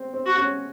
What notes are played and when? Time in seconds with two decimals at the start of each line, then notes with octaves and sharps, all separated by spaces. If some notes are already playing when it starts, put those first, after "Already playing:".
Already playing: C4
0.13 C4
0.26 F#4
0.37 C#4